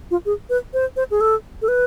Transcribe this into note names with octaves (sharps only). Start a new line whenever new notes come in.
F4
G#4
B4
C5
C5
G#4
A4
A4
B4